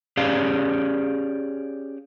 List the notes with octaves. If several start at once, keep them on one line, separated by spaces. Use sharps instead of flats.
C#4 G4 G#4 D5 F5